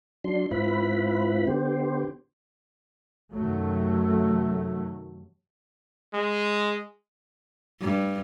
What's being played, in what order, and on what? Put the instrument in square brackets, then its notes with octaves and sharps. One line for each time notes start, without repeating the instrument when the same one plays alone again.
[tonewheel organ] F#3 D4 C6
G#2 C4 E4 F4 B4 B5
D3 B3 G4 C5
[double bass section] F#2 C3 D#3 F#3 A3
[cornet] G#3
[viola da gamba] G2